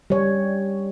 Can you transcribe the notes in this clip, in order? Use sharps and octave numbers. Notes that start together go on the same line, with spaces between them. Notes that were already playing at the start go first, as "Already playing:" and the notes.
G3 C#5